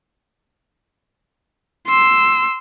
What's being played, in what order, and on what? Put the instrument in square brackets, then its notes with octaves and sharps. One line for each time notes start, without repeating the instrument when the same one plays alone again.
[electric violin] C6 E6